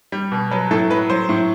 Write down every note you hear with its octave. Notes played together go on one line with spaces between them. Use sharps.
G3
B2
F#3 B4
A2 A4
F#3 B4
F#3 C5
A2